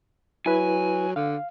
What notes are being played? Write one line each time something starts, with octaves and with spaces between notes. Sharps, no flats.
F#3 E4 B4 G#5
D3 F5